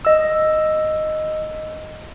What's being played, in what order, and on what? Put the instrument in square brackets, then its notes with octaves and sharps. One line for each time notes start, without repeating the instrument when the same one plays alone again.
[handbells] D#5 E6